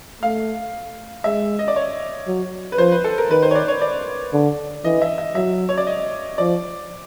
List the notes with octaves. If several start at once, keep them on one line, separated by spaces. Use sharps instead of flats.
A3 F5
G#3 E5
D#5
D5
C#5
F#3
B4
F3 C5
B4
A4
A#4
D#3 B4
C5
C#5
D5
C#5
D5
D3
E3 D#5
E5
E5
F#3 E5
C#5
D5
D#5
F3 D5